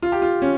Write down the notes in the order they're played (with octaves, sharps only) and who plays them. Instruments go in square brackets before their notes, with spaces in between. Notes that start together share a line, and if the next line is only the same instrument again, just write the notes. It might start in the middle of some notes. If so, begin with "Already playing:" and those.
[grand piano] F4
G4
F4
C#4